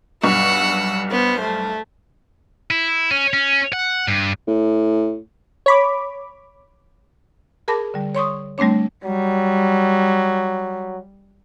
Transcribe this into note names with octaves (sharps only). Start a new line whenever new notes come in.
B1 G2 F#5 C#6 E6
B3 C5
A3
E4
C#4
C#4
F#5
G2
A2
C#5 B5 D6
G#4 A#4 A5 B5 D6 A#6
D3 G3
C#5 C6 C#6 D#6
G3 A3 C4 D4 C#5
F#3 G3